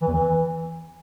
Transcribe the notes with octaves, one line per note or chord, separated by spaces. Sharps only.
E3
E2
E3